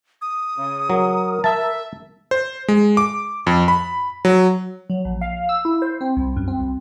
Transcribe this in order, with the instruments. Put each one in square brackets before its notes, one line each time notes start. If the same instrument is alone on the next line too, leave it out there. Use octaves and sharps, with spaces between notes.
[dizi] D#6
[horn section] C#3
[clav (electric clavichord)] F#3 [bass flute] A#4
[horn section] E5 [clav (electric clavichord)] A5
[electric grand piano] C5
G#3
D6
F2
B5
F#3
[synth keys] F#3
A#1
F5
E6
E4
C5
C4
C2
F#2
C4
C2